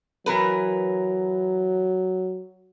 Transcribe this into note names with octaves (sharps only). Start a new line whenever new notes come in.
E3 F#3 A#4 B4